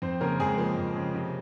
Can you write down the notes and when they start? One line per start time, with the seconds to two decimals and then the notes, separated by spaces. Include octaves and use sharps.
0.02 F2 C4 C5
0.21 C#3 A#3 A#4
0.40 F2 G#3 G#4
0.58 F3 A#3
0.77 F2
0.95 C#3
1.14 C3